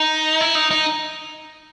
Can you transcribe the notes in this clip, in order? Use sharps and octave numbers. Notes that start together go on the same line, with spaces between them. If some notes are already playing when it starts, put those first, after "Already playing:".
Already playing: D#4
E4
D#4
D#4